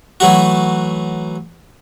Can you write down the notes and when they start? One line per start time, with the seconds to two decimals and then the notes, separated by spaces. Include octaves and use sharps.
0.20 E3 F#3 A3 F#4